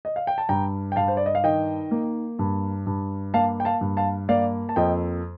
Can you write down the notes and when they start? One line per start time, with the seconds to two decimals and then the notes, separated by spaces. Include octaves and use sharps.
0.05 D#5
0.16 F5
0.27 G5
0.38 A5
0.49 G2 G5 A#5
0.92 G5
0.96 G2 F5 A5
1.08 C5
1.17 D5
1.26 D#5
1.35 F5
1.44 D#3 D#5 G5
1.91 A#3
2.39 G2
2.87 G2
3.34 A#3 F5 A5
3.60 G5
3.65 F5 A5
3.81 G2
3.97 F5 A5
4.29 A#3 D5 F5
4.69 A5
4.76 F2 D#5 G5